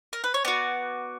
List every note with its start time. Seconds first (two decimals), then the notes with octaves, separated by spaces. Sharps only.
0.13 A#4
0.24 B4
0.34 C#5
0.45 B3 F#4 D5